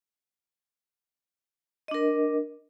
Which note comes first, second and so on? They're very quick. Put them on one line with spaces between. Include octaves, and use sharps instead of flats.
D#5 D4 A#4